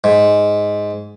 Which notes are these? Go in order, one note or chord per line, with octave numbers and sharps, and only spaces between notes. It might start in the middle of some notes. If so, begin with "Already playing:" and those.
G#2